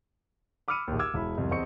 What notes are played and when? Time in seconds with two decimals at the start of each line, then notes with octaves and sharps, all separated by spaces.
0.68 B5 D6 E6 F6 C#7 D#7
0.88 A#1 D#2
0.99 D6 E6 F6 G#6
1.14 E1 E4 B5
1.38 C2 F2
1.51 E2 C4 D#5 C#6 C#7